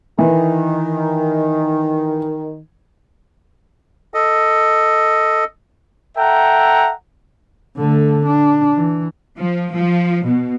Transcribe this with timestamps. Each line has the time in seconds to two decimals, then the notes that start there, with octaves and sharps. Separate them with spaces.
0.19 D#3 E3
4.14 A4 D#5
6.17 A4 E5 F#5 G5 A#5
7.77 D3 A3
8.26 D4
8.76 E3
9.38 F3
9.72 F3
10.25 B2